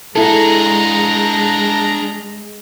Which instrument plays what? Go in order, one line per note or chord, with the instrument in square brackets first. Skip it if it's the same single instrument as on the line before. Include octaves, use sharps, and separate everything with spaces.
[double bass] G#3 [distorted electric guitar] D4 G#4 [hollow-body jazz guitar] E4 A4 [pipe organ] A#5